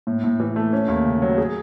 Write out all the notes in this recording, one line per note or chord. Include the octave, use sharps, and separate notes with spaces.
A2
A2
E3
A3
C#4
D#2
C#3
F#3
G#4